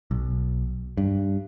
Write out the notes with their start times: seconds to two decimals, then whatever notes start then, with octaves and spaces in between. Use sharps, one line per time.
0.11 B1
0.97 G2